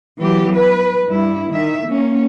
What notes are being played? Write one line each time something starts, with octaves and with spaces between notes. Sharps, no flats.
E3 F#3 B3 G4
B4
G2 E4
D#3 E5
A#3 C#4